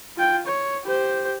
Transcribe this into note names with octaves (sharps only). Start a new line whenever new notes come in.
F4 G5
C#5
G4 C5